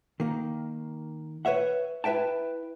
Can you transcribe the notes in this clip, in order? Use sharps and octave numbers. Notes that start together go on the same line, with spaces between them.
D#3 A#3
B4 C#5 E5 F#5
E4 B4 E5 G5 A5